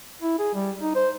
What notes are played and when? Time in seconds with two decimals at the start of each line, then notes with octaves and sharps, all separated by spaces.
0.22 E4
0.38 G#4
0.54 G3
0.82 D#4
0.95 C5